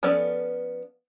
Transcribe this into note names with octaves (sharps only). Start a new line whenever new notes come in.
F3 B3 C#4 A4 D5